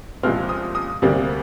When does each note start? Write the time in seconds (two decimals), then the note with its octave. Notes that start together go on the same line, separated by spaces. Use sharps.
0.23 C2 A#2 F3 G#3 C4 F6
0.49 D#6
0.75 D#6
1.02 D2 C3 G3 A#3